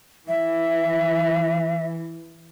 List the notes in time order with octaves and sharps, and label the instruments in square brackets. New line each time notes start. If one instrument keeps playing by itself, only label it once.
[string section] E3 [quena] E5